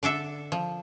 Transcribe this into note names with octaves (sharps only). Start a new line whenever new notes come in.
D3 D4 A4 E5
F3